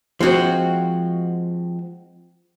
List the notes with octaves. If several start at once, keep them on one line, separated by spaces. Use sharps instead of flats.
F3 G#3 C4 F#4